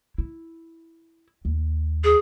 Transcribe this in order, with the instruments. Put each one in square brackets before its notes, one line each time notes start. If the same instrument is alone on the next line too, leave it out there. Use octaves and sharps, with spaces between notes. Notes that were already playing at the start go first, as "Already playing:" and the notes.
[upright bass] E4
D#2
[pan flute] G#4